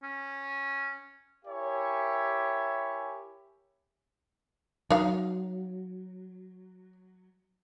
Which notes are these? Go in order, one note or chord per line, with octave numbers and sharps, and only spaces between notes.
C#4
E4 G4 A#4 C#5 E5 G#5
F#3 D#4 F5